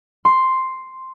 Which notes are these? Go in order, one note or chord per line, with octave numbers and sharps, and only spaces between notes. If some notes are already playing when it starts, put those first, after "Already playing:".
C6